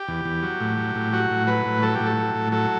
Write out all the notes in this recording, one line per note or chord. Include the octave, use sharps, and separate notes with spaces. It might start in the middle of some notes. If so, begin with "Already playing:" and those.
Already playing: G4
E2
E2
F#3
A2
F#3
A2
F#3 F#4
A2
F#3 B4
A2
F#3 A4
A2 G4
A4
F#3
A2
F#3 A4